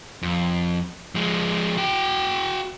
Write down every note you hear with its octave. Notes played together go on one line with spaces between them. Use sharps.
F2
F3 G#3
F#4 G5